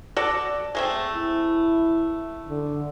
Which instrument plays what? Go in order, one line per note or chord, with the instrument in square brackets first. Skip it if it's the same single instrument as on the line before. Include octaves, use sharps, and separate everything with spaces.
[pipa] F#4 A4 D5
G#3 A3 C4
[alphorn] E4
D3